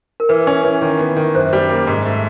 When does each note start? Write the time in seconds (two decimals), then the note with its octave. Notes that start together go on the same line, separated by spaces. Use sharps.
0.20 A#4
0.29 E3 B4
0.47 C#4
0.64 E3
0.82 D#3
0.99 B3
1.17 D#3
1.35 F#2 C5
1.53 G3
1.70 A#3
1.87 G#2
2.05 A3